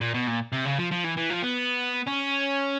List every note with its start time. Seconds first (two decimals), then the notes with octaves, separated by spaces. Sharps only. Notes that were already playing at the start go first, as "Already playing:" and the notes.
0.01 A#2
0.14 B2
0.27 A#2
0.52 C3
0.65 C#3
0.78 F3
0.91 F3
1.04 E3
1.17 E3
1.29 F3
1.43 B3
2.07 C#4